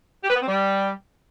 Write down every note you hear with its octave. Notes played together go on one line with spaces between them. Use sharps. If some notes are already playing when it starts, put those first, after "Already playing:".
G4
B4
B3
C4
G3